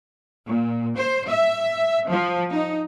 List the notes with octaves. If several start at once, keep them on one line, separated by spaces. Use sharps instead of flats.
A#2
C5
E5
F3
D#4